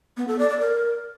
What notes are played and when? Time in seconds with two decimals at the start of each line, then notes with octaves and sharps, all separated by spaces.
0.17 B3
0.28 A4
0.39 D5
0.49 D5
0.60 A#4